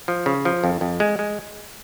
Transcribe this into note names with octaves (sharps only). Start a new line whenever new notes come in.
F3
C#3
F3
F2
F2
G#3
G#3